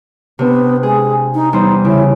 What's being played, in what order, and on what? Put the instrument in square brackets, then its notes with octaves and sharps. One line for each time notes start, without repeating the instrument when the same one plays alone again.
[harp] C3 D4 [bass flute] B3
[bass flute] G#3 [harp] G#4
[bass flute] D#4
[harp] E2 G3 C5 [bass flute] D#4
[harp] C#3 [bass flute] E4